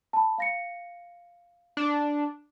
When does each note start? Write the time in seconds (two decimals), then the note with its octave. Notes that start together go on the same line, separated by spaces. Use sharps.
0.13 A5 B5
0.38 F5 A#6 C#7
1.77 D4